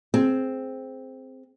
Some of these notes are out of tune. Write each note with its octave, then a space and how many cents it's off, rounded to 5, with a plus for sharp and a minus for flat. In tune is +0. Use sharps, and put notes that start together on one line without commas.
C4 +0 G#4 +20